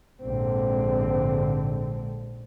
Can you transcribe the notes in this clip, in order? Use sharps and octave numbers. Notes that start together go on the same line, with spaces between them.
A#1 G#2 D3 C4